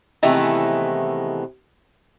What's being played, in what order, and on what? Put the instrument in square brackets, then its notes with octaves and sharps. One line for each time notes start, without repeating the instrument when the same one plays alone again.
[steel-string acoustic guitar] C3 D#3 E3 G#3 A3 B3